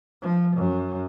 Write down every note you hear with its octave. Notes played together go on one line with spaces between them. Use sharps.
F3
F#2